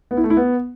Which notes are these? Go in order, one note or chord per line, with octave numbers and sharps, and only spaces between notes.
B3
E4
A3
E4
B3